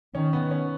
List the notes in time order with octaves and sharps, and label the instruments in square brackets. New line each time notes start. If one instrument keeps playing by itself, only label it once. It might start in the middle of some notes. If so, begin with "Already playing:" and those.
[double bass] D#3 [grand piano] C#4
[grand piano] B3
C#4